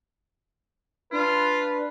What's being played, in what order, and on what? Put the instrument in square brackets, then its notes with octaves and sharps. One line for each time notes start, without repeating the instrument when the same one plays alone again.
[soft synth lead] D4 [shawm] F4 [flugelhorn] B4